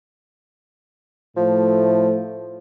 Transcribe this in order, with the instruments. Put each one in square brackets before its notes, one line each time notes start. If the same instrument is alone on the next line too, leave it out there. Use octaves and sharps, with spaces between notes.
[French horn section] A2 A3 [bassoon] F3